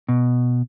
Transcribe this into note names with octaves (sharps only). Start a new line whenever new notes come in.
B2